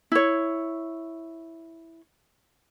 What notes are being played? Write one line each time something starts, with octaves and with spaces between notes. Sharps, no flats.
E4 C#5